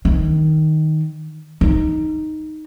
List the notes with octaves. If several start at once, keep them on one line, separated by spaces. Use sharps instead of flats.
D#3
D#4